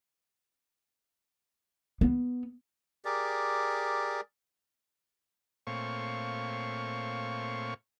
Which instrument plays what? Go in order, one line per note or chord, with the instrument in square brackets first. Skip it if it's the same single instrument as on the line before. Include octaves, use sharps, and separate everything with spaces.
[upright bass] B3
[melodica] G4 G#4 A#4 D5
[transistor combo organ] A#2 A3 C4 C#5 F5 C#6